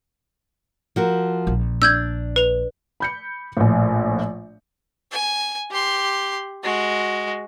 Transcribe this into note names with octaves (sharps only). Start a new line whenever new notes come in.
F3 F#4 A#4
A#1
D4 E6 G6 G#6
B4 F7
B5 G6 C#7
A#1 A2
G#5
G4 C6
G#3 F#4